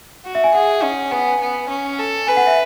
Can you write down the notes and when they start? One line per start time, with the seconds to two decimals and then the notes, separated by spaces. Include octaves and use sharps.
0.25 F#4
0.35 E5
0.44 G#5
0.55 G#4 F#5
0.83 C#4
1.12 B3 G#5
1.19 F#5
1.27 G#5
1.41 B3
1.69 C#4
1.99 A4
2.27 B4 G#5
2.37 F#5
2.47 E5